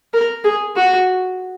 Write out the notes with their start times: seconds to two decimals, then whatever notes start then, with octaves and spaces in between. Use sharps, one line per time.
0.13 A#4
0.44 G#4
0.76 F#4